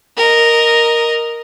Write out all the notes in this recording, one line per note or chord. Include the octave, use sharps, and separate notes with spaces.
A#4 D#5